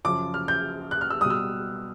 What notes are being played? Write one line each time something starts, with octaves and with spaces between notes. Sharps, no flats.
F#2 C#3 F3 D6
F6
G6
F#6
F6
E6
B2 G3 D#6
E6